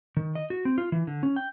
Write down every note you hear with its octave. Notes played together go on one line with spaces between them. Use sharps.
D#3
D#5
F#4
C4
F4
E3
D3
C#4
G5